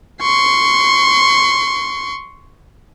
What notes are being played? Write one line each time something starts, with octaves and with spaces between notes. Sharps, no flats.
C6 C#6